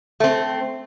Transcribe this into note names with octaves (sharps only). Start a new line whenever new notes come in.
A3 C4